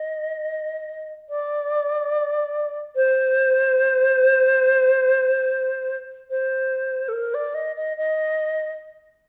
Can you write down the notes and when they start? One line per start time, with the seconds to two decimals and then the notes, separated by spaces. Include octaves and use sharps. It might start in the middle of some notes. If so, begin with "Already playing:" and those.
Already playing: D#5
1.29 D5
2.96 C5
6.30 C5
7.08 A4
7.12 A#4
7.34 D5
7.54 D#5
7.76 D#5
7.97 D#5